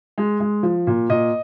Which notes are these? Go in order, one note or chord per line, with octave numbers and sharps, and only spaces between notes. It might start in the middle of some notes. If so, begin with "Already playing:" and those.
G#3
G#3
F3
A#2
A#2 D#5